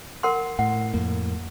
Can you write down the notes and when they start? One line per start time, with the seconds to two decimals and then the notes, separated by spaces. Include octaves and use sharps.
0.23 A#4 F#5 C6
0.59 A2 F#5
0.94 F2 A2 A#3